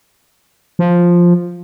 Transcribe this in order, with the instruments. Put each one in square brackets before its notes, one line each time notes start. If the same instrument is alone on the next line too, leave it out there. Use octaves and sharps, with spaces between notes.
[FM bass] F3